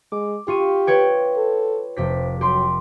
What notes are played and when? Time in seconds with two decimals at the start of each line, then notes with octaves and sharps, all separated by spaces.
0.12 G#3 D6
0.48 F4 G4 C#6 D#7
0.87 B4 C#5 G5
1.37 A4
1.96 F1 G4 C5 B6
2.41 F#3 G4 C6